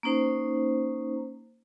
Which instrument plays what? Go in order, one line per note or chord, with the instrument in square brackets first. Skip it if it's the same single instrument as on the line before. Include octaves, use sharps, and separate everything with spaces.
[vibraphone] A#3 C#4 D#4 C5